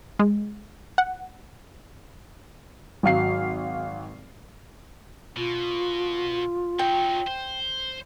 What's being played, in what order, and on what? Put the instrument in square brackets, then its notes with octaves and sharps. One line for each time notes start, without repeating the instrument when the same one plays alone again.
[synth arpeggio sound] G#3
F#5
[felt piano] G#1 F#3 F5 C7
[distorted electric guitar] B2 [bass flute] F4
[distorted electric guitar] F#3 D#4 [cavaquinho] G5
[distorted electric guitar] C5